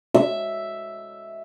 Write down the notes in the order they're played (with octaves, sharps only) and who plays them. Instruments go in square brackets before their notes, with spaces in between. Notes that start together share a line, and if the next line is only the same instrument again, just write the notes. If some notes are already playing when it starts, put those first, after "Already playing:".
[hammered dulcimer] E5